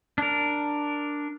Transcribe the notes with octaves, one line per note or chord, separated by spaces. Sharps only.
D4 A#4